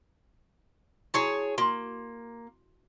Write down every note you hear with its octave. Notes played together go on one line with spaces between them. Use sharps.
E4 F#4 G#4 C#5 A5 C#6
A#3 F#4 C6